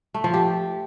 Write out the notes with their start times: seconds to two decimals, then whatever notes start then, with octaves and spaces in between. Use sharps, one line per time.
0.14 A3
0.24 F3
0.34 G4